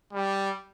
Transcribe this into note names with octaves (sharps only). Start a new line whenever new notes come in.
G3